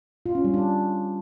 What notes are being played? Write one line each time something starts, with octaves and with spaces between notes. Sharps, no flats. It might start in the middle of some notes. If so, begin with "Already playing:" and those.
F4
C#4
G3
D4